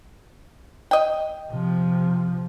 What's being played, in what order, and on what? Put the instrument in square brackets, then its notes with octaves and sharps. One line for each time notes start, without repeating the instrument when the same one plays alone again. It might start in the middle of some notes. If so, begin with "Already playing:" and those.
[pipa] D#5 G5
[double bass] C3 F3